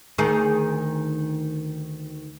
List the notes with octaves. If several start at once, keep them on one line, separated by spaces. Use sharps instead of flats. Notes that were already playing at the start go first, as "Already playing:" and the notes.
D2 D#3 G#4